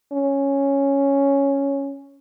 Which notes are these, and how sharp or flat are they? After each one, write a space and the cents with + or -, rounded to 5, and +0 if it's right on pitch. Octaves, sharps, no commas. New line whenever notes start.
C#4 +0